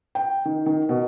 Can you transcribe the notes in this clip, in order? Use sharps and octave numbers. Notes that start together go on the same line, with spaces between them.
G5
D#3
D#3
B2